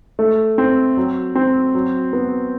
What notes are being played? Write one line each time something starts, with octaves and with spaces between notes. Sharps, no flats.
A3
C4
F#3
C4
F#3
B3